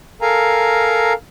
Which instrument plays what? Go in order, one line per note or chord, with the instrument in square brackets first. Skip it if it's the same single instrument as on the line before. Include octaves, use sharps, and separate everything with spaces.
[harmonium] A4 A#4 F5 G#5 A#5